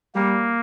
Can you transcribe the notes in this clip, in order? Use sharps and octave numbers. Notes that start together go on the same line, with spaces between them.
G3 A#3